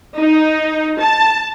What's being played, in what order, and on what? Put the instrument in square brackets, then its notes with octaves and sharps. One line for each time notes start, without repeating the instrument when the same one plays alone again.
[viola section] D#4
A5